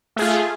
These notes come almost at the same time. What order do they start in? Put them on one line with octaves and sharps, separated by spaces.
A3 G#4 F4